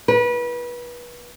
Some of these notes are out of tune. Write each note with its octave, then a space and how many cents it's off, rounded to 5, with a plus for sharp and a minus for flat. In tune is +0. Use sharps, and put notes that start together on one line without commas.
B4 -30